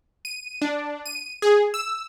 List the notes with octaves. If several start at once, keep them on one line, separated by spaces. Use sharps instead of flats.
D#7
D4
D#7
G#4
E6